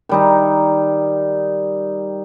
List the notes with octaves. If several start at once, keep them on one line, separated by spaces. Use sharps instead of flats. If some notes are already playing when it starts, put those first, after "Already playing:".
D#3 G3 D#4